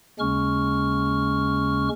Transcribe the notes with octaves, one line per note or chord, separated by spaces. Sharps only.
D#2 C#3 G#3 C#4 C#6 F6